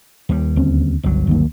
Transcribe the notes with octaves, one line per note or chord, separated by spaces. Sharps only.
D#2 G3
D2 C4 C#4
G1 C#2 F#3
D2 D#3 A#3